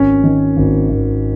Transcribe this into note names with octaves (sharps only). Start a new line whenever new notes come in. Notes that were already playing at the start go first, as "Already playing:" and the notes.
Already playing: G#1 C#4
D#3
G#1
G#1